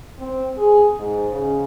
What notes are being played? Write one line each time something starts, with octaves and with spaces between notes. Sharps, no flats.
C4
G#4
G#2
C#3